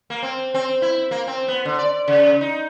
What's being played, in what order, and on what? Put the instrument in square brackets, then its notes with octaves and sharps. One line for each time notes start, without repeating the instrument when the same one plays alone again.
[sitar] A#3
C4
C4
E4
A#3
C4
B3
D3
D5
C#3
D#4